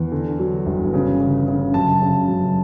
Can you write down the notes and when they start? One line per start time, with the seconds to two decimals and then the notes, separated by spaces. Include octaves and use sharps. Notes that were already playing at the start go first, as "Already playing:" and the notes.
Already playing: E2
0.12 D3
0.39 F#3
0.66 G1
0.94 C#3
1.20 C#3
1.48 C#3
1.74 F#2 A5
2.02 C#3
2.28 F#2